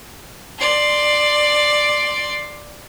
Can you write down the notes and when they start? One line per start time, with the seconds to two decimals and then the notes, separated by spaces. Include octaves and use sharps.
0.59 D5 C6